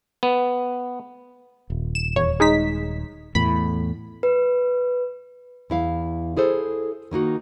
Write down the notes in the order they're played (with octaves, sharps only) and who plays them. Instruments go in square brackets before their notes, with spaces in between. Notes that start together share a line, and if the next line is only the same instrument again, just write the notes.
[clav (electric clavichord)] B3
[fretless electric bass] D#1
[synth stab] E7
E2 C#5
G#3 D#4 B6
[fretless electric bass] E2 A2 [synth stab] B5
[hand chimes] B4
[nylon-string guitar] E2 E4 F5
E4 G#4 A4 C5
D#3 A#3 D#4 F#4